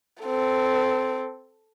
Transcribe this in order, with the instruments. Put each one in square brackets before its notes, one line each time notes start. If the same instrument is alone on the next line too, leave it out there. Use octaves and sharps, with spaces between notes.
[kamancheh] C4 A4